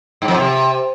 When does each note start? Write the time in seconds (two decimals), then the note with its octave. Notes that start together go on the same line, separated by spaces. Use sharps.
0.22 G#2
0.28 F2
0.34 C3